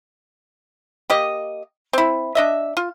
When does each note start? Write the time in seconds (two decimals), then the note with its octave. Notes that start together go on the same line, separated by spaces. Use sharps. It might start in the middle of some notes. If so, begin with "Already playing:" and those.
1.10 A#3 G4 D#5
1.93 C4 E4
2.35 D4 D#5 E5
2.77 F4